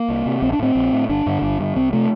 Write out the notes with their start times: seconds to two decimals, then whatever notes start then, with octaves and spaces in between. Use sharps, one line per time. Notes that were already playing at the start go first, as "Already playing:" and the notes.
Already playing: A#3
0.08 C2
0.26 C3
0.42 A#1 C4
0.53 D4
0.59 A2 C4
0.75 A#1
0.92 A2
1.09 G1 D4
1.26 G2 D3
1.42 G1
1.59 G2 D3
1.76 C2 C4
1.92 C3 A3